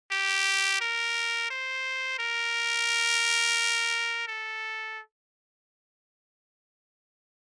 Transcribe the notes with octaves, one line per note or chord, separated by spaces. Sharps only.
G4
A#4
C5
A#4
A4